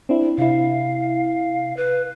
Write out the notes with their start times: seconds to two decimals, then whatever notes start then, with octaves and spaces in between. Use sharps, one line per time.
0.09 C4 D4 E4
0.38 C3 E4 F5
1.77 B4